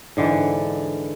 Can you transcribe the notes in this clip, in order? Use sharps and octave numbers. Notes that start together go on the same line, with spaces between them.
G#2 D3 E3